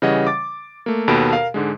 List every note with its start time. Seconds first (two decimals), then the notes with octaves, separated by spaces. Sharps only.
0.02 C#3 E3 G3 C#5 D#5 F#5
0.27 D6 A6
0.86 A3 A#3
1.08 D#2 B2 A4 B5 D7
1.33 A#4 F5
1.54 G#2 D3 G#3